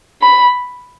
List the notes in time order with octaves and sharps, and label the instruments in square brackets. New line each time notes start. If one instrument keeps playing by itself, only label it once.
[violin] B5